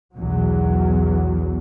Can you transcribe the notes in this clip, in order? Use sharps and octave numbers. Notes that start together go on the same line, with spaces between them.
B1 E2 F#3